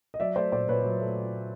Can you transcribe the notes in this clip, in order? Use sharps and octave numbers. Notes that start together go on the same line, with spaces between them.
D#5
F#3 D5 E5
A3 C5 D5
A#2 C5 D5
A#2 B4 C#5
F#3
A3